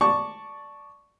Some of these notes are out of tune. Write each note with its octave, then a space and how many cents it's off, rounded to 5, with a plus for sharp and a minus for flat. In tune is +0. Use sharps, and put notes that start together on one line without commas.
D5 +0 A5 +0 C#6 +0